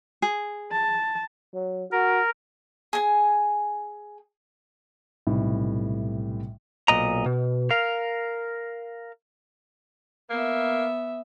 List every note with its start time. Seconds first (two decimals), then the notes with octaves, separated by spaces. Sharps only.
0.22 G#4
0.71 A5
1.54 F#3
1.92 F#4 A#4
2.93 G#4 G#5
5.27 B1 A2 C3 G3 A3
6.88 B1 A#2 D#5 A#5
7.26 B2
7.71 A#4 F5
10.30 A#3 B3 E5